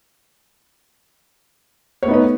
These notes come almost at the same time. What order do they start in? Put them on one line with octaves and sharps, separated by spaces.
C#5 A3 B3 D#4 B4